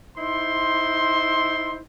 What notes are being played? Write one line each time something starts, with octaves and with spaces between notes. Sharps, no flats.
D#4 E4 C5 C6